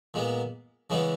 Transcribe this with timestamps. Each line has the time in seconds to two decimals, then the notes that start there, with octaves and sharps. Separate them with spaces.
0.14 A#2 G#3 B3
0.90 C#3 E3 G#3 B3